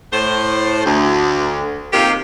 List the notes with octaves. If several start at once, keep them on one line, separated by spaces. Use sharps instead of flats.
A2 C5
D2
C3 D#3 A#3 F4 G4